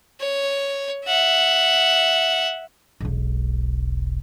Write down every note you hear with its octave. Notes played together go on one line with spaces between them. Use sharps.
C#5
E5 F#5
E1 B1